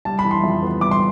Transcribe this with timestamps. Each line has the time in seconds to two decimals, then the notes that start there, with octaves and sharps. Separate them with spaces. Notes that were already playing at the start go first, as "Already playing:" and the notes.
0.05 G3 A5
0.19 B5
0.25 E3
0.31 C6
0.44 F2
0.63 B3
0.81 G3 D6
0.91 C6